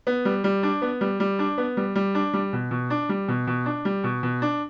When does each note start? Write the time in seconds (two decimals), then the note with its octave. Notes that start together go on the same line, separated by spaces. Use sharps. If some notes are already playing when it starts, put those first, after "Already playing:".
0.07 B3
0.25 G3
0.44 G3
0.63 D4
0.82 B3
1.01 G3
1.20 G3
1.39 D4
1.58 B3
1.77 G3
1.95 G3
2.15 D4
2.34 G3
2.53 B2
2.71 B2
2.90 D4
3.09 G3
3.28 B2
3.47 B2
3.66 D4
3.85 G3
4.04 B2
4.23 B2
4.42 D4